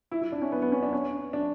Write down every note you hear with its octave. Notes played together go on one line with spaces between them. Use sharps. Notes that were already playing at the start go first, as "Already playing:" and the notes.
E4
E4
D4
C#4
B3
B3
C#4
D4
C#4
D4